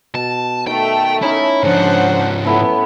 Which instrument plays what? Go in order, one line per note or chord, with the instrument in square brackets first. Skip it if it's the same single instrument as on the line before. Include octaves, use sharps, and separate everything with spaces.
[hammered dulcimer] B2 [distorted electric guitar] A5
[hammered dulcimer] D#3 [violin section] A3 [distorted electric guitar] G5
[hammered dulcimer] C#4 D#4 A#4 [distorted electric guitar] E4
[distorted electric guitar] G#2 F3 [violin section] D4 C5 F#5
[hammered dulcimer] A2 E4 A4 [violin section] B3